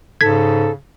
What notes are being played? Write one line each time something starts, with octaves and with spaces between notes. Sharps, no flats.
G#2 C#3 A4 G#6 B6